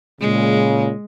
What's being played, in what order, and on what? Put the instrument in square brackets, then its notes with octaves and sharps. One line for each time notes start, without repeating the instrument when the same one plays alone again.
[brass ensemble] A#2 C#3 [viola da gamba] G#3